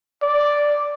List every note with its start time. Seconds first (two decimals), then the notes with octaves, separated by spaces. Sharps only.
0.22 D5